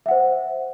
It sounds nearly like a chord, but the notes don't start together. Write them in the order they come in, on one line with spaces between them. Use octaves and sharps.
E5 F#5 C5